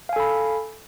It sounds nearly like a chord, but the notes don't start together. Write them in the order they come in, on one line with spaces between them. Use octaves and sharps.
F5 G#5 A4 B5